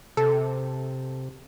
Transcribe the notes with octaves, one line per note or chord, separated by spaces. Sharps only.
C3 A4